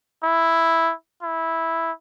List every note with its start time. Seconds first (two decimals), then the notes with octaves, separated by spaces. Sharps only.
0.23 E4
1.22 E4